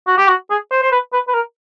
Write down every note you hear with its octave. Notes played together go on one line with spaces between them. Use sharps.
F#4
G4
F#4
G#4
C5
C5
B4
B4
B4
A#4